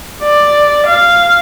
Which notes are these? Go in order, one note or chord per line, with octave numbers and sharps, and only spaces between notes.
D5
F5